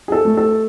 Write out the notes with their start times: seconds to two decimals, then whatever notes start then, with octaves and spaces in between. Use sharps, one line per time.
0.08 G#4
0.12 A4
0.25 A3
0.37 A4